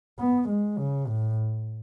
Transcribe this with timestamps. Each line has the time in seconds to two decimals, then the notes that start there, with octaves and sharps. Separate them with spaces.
0.19 B3
0.49 G#3
0.78 C#3
1.07 A2